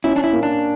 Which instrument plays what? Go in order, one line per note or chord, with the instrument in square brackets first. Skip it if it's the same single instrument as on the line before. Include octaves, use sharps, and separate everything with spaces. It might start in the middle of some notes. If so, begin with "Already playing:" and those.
[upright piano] C#4 [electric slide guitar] E4
[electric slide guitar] D4
E4
[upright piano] A#3
[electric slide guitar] D4